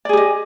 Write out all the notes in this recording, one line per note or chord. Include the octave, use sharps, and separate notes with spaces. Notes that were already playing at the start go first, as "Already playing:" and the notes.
G4 G#4 D5 D#5